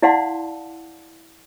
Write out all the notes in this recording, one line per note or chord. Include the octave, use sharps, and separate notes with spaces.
E4 D5 F5 F#5 A5 C6